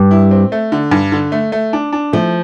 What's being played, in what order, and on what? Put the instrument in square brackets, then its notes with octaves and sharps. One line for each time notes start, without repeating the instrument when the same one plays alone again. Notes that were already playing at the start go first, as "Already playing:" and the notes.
Already playing: [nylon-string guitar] G2 G3
[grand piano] E4
C4
A3
D3
G2
D3
A3
A3
D4
D4
[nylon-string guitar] F3 [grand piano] A3